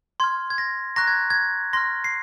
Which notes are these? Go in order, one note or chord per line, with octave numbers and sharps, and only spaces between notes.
C6 F6 G#6
G#6
A#6
A#5 C#6 F#6 A#6
G#6
G#6
C6 F6 A#6
C7